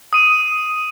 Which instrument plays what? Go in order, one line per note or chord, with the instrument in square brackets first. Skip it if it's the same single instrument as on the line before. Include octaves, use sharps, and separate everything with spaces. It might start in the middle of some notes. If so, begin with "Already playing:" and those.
[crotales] D#6 D#7